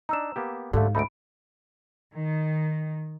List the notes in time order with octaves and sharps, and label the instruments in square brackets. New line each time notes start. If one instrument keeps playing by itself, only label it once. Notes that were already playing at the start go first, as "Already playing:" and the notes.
[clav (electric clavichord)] D4 D#4 [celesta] A#5 E6 E7
[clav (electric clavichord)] A#3 B3 G4
[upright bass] G#2 [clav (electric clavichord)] D3 A3 [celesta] G4 A4 F5
[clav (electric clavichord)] D2 A3 D#4 [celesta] B5 D7
[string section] D#3